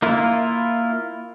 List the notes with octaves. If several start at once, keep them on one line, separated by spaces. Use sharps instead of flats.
A#3 E4 F4